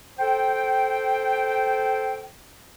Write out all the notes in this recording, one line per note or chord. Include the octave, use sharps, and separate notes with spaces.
A4 C5 G5